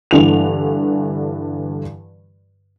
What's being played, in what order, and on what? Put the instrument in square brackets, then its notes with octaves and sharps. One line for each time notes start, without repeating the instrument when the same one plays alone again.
[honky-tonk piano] G2 D3 E3 F7